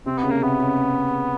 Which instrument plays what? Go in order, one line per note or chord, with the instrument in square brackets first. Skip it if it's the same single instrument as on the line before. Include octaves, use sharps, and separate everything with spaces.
[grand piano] C3 [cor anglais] C4
[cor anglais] B3
[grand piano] C#3
[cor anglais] A#3
[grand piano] C3 [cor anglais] B3
[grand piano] C#3